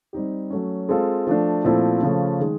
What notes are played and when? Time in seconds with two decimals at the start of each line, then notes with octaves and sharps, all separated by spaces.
0.13 G3 C4 D#4 G4
0.50 F#3 A3 C#4
0.89 G#3 C4 F4 A4
1.27 F3 A3 D4
1.64 A#2 F3 A3 C4 E4
2.02 C#3 F3 A3 C#4
2.39 D#3 G#3